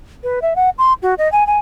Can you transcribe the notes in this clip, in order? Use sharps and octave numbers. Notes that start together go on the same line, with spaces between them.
B4
E5
F#5
C6
F#4
D#5
G#5
G#5